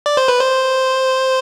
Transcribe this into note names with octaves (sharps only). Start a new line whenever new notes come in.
D5
C5
B4
C5